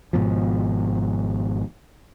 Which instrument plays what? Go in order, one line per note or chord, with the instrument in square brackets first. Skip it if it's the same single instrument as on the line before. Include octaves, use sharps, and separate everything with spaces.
[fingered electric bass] G#1 G#2 B2 F3